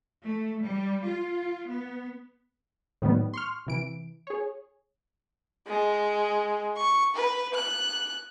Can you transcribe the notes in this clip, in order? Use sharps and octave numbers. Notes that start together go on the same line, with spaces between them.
A3
G3
F4
B3
A2 D#3 F#3 G3 B3
C6 C#6 F6
C3 E3 D7
G#4 C#5
G#3
C#6
B4
F#6